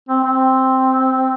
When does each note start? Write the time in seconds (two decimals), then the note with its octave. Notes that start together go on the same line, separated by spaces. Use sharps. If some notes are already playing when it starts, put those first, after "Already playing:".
0.09 C4
0.24 C4